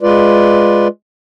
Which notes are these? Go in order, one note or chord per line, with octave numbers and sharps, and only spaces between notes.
G#3 F4 B4 D5